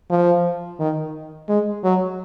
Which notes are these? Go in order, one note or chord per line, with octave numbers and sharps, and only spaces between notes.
F3
D#3
G#3
F#3